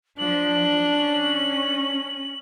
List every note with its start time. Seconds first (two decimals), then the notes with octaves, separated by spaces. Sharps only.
0.18 F3 D4 F#7
0.89 C#4